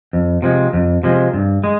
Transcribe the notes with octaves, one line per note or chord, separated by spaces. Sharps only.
F2
C3 F3 G#3
F2
C3 F3 G#3
G2
G#3